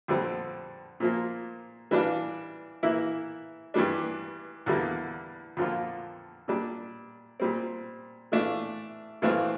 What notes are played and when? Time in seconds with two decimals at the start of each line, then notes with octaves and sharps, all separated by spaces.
0.08 F2 D3 G3 C4
1.00 A#2 F3 A#3
1.91 E3 G3 D4 F4
2.83 E3 A#3 E4
3.74 G2 E3 G3 D4
4.66 E2 D3 G3 A#3
5.57 F2 D3 F3 A#3 F4
6.48 A#2 G3 D4
7.40 A#2 G3 C4
8.32 E3 A3 D4 F4
9.22 G2 E3 A3 C4 F4